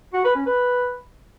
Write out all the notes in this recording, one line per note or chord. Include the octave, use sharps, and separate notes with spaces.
F#4
B4
C#4
B4